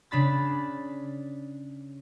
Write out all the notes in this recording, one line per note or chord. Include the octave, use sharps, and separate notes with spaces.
C#3 D4 B5 A6